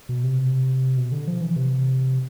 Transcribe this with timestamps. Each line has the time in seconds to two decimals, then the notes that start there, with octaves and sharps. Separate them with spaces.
0.09 B2
0.23 C3
0.97 B2
1.12 D3
1.28 F3
1.41 E3
1.56 C3